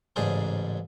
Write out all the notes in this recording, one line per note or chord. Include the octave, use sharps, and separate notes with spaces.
A1 G#2 C#3 D4 G#4 C5